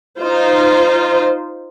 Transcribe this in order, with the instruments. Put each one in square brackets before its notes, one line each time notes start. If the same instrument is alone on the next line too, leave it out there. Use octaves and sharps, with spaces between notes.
[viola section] D#4 F4 C5